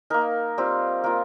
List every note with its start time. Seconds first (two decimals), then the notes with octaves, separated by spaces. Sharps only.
0.10 A#3 D#4 A#4
0.58 G3 C4 F4
1.04 A#3 F4 A#4